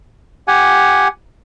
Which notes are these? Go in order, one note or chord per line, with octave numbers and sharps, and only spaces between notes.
G4 F#5 G#5